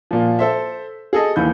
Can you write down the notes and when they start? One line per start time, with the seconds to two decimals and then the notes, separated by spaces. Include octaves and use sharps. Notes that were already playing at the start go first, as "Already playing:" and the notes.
0.11 A#2 F3
0.39 A4 C5 E5
1.13 G#4 A4 D#5
1.36 D#2 E3 B5 G6